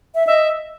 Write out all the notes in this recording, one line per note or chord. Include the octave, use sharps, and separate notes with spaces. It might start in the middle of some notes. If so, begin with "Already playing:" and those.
E5
D#5 E5